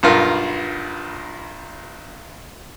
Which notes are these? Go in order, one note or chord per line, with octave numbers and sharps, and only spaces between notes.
B1 G2 F4 A#4